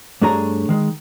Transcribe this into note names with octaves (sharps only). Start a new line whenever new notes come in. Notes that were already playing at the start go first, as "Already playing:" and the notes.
G2 A3 D4 G#4 C#5 A#5
D#3 G#3